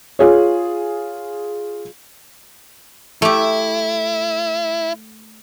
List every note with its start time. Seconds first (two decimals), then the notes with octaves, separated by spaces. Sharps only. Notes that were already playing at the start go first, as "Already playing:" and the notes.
0.19 F4 G#4 C#5
3.22 A3 E4 G4